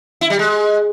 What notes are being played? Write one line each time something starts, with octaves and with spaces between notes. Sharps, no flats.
E4
G3
G#3